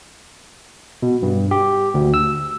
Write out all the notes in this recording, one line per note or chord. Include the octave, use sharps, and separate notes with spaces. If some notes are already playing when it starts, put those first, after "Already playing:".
B2
G2
G4
D2
E6